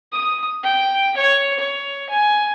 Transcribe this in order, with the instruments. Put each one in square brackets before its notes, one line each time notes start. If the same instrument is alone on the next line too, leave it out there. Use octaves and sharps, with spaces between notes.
[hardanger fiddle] D#6
G5
C#5
C#5
G#5